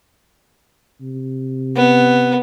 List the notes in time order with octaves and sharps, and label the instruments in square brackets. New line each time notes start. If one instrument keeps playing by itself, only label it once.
[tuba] C3
[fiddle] B3